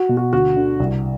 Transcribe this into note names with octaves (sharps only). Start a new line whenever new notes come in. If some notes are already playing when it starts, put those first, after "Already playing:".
Already playing: F#4
B2
F#4
D2 F#4
D3
C2